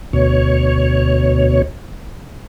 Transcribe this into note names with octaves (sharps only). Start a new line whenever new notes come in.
D2 B2 C#5